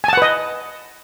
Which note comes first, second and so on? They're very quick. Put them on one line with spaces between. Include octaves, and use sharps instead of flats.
G#5 A5 F#5 B4 D#5